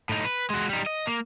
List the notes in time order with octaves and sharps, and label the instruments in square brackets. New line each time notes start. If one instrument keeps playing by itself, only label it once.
[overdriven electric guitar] A2 D#4
B4
G#3 F#4
G3 D#4
D#5
A#3